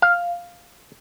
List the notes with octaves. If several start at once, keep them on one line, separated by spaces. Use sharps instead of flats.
F5